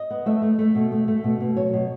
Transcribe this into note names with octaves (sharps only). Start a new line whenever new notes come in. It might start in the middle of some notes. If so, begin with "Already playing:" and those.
Already playing: D#5
B3
A3 E5
A3
A3
B2
A3
A3
B2
B2
F#3 C#5
B2